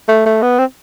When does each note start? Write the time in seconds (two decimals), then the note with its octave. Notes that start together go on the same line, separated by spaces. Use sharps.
0.09 A3
0.26 A3
0.42 B3
0.59 C4